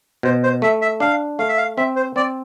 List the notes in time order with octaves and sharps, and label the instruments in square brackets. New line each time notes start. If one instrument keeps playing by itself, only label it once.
[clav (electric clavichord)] B2 [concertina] C5
[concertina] C5
[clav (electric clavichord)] A3 [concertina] E5
[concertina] E5
[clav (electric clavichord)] D4 [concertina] F5
[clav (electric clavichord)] A3 [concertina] F5
[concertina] E5
F5
[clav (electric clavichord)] C4 [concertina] E5
[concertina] C5
[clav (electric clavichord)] C4 [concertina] D5